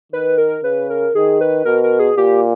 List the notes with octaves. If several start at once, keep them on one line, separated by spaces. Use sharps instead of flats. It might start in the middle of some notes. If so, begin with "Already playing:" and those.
D#3 B4
A#4
C#3 B4
A#4
D#3 G#4
B4
B2 A#4
A#4
G#4
A#2 G4